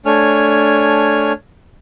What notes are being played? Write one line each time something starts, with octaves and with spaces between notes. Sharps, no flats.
A3 D4 C#5 G#5 F6